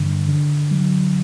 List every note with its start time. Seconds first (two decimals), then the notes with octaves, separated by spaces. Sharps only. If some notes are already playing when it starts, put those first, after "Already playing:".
Already playing: G2 D3
0.28 D3
0.71 F#3